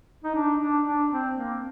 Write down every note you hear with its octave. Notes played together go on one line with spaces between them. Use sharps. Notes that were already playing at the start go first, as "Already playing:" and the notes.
D#4
D4
D4
D4
C4
A#3